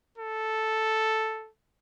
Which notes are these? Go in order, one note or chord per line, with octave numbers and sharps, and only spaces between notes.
A4